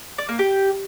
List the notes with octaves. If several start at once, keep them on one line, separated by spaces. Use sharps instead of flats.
D5
A#3
G4